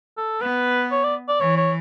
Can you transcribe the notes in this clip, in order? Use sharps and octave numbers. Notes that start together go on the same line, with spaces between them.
A4
B3 B4
C#5
D5
D5
E3 C#5
C#5